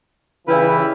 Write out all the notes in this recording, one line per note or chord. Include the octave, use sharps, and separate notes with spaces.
C#3 E3 G3 D#4 E4 B4